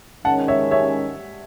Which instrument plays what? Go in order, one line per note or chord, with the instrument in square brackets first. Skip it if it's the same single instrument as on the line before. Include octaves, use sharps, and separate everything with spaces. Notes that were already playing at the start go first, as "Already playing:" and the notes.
[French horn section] D#3 G#3 C#4 [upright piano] F#5 A5
[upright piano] C#5 E5
C#5 E5